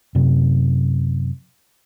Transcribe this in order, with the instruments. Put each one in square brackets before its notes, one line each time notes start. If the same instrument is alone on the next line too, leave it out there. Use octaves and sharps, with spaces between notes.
[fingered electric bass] F#2 C3